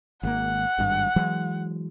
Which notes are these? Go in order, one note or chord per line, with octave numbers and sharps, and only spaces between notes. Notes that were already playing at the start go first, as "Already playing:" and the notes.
G#1 D3 A#3 F#5
G#1 G2
E3 F#3 G#3